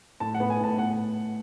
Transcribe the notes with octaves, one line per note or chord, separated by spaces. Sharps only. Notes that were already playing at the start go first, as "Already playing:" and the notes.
A2 A5
F#5
B3
G#5
A2 A5
B3 F#5